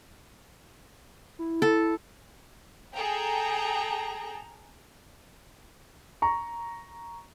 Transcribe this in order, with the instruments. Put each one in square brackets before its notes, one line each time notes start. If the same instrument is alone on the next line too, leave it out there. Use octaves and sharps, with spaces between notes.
[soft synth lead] E4
[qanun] A4
[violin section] G#4 A4 G5 A#5
[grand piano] A#5 C#6